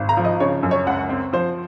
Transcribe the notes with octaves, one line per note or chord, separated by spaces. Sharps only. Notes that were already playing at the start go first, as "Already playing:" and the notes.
Already playing: G#1
A#5
F3
D#5
C#3 C#5
F#2
C#5
C#2 F#5
C4
F3 C5